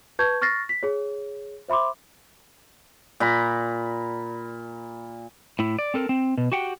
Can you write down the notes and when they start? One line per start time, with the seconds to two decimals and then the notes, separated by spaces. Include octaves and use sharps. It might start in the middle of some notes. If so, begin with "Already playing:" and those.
0.19 B4 A5 C#6 G6 G#6
0.41 C#6 F6 A6 A#6 C7
0.69 B6
0.83 G#4 C#5
1.68 C5 E5 B5 C6 D6
3.20 A#2 A#5 B5
5.59 A2 E4
5.79 D5
5.94 C4 A4 A#4
6.09 C4
6.38 B2
6.52 F#4 G4 F#5 G5